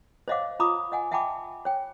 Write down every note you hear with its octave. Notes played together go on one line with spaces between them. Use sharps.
C5 C#5 D#5 F5 F#5 D6
F4 A#5 B5 D6 D#6
D#5 F#5 G#5
E5 F#5 G5 A5 B5 D6
C#5 G5